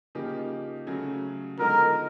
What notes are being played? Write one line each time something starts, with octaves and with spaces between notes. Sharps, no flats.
C#3 F3 A#3 D#4 G4
C#3 F#3 A3 C#4
D3 F3 G#3 B3 D#4 A#4